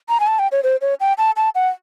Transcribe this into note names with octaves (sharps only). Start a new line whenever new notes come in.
A#5
G#5
A5
G5
C#5
C5
C#5
G5
A5
A5
F#5